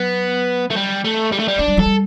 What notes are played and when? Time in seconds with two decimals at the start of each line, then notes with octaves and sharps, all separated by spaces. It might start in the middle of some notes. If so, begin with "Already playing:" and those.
Already playing: F#3 B3
0.71 A3
0.77 G3
1.05 A3
1.32 G3
1.39 A3
1.48 G3
1.58 A3 D4
1.67 G3
1.77 F#3 A4
1.86 G3